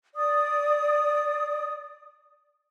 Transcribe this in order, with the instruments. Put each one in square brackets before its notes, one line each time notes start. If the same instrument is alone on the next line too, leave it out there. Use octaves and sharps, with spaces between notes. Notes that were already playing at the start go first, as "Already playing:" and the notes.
[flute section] D5 D#6